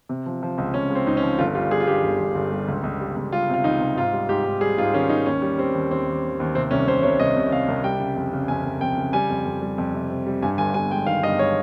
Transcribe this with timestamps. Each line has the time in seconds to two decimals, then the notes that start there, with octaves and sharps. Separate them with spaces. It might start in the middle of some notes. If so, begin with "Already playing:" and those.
0.09 C3
0.26 F3
0.43 F3
0.58 C#2
0.74 C#2 C#4
0.90 G#3 C4
1.07 C#2 D#4
1.17 C#4
1.23 F3
1.38 G1 F4
1.55 G3 F4
1.71 G3 G#4
1.80 F4
1.87 G2 G4
2.03 G1
2.20 G1
2.35 G1
2.52 G3
2.68 C#2
2.84 C#2
3.00 G3
3.16 C#2
3.32 G3 F4
3.49 C3 F4
3.64 C#2 D#4
3.81 C3
3.96 G#2 F4
4.13 G3
4.29 G#2 G4
4.45 G#2
4.61 G3 G#4
4.78 G#2 F4
4.94 D#3 C#4
5.09 D#3 D#4
5.26 D#2 C#4
5.42 G3
5.58 G3 C4
5.74 D#2
5.91 D#2 C4
6.06 D#2
6.23 D#2
6.40 D#2
6.55 C3 C4
6.71 C2 C#4
6.87 C2 C5
7.03 C2 C#5
7.20 C2 D#5
7.36 C3
7.52 C3 F5
7.68 C2
7.84 G3 G5
8.00 C#3
8.16 F2
8.33 C#3
8.48 F2 G#5
8.64 F2
8.81 F2 G5
8.98 C#3
9.13 G3 G#5
9.30 F2
9.45 F2
9.62 G3
9.78 F2
9.94 C3
10.10 C3
10.26 G3
10.43 G2 G#5
10.58 G1 G#5
10.74 G2 G#5
10.91 G#3 G5
11.06 D#3 F5
11.23 G2 D#5
11.39 G#3 C#5